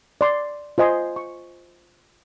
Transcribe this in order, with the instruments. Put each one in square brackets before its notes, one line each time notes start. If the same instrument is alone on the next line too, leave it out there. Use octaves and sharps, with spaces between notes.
[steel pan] D5 C6
F4 C5 D#5 G#5 C6
C#6